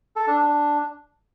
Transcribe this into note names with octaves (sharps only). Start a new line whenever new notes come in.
A4
D4
D4